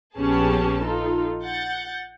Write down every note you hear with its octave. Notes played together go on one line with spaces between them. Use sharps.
A#1 B3 C#4 G4 G#4 A5
D#4 F4 A4
F#5 G6 A6